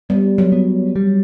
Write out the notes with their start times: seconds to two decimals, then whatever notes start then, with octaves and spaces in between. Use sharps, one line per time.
0.10 G3 B3
0.38 F#3
0.52 B3
0.96 G3